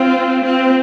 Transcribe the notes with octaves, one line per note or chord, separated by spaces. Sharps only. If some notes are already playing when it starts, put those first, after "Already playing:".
Already playing: C4 F4
C4